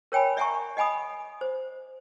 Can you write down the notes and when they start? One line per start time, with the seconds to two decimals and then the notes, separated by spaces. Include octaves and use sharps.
0.12 A#4 C#5 G5 G#5 B5
0.37 D5 E5 F#5 G#5 A#5 C#6
0.77 D#5 F#5 G#5 B5 D#6
1.41 C5